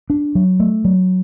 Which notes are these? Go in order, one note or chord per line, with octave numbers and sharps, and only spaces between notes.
D4
F#3
A3
F#3